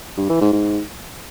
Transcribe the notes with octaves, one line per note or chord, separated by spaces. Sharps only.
G2
E3
G#2
G#2